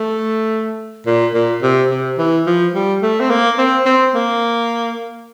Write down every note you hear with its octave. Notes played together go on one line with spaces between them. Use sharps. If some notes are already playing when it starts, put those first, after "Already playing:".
Already playing: A3
A#2
A#2
C3
C3
E3
F3
G3
A3
C4
A#3
C4
C4
A#3